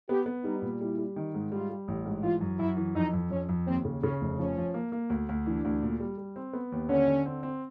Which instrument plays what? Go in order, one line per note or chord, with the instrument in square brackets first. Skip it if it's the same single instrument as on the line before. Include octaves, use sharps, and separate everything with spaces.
[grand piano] B3 [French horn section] G4
[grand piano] B3
[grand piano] G3 [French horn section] D#4
[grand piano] A#2
[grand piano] G3 [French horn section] E4
[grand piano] G3
D#3
G#2
[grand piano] G3 [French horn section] F4
[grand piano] G3
A1
G#2
[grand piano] E3 [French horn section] F4
[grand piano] F#2
[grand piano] F#2 [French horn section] E4
[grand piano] E3
[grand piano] F2 [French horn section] D#4
[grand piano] F2
[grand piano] F2 [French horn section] C#4
[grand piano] F2
[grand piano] D#2 [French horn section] C4
[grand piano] C#3
[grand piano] C#3 [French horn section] C#4
[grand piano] F1
[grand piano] F3 [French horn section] C#4
[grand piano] F3
A#3
A#3
D2
D2
[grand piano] E3 [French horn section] D4
[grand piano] D2
A#2
G3
G3
C4
B3
D#2
[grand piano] D3 [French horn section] C#4
[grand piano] D3
C4
C4